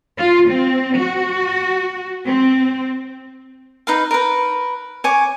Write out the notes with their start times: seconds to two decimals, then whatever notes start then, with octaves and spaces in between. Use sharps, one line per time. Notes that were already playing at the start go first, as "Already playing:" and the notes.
0.18 F4
0.49 C4
0.97 F#4
2.25 C4
3.87 D#4 B4 F5
4.11 A#4 B4
5.04 C#5 G#5 D6